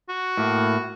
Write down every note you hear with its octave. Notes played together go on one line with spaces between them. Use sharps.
F#4
A2 A#3